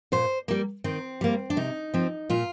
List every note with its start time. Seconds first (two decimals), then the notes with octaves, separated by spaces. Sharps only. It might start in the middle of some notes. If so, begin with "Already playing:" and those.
0.12 A#2 C5
0.48 G3 A#3
0.84 D#3 C4
1.21 G3 A#3
1.50 D4
1.56 C3 D#4
1.94 F3 C4
2.30 A#2 F4